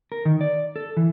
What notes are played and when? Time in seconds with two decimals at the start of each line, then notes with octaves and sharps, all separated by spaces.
0.12 A#4
0.25 D#3
0.41 D5
0.76 A4
0.97 E3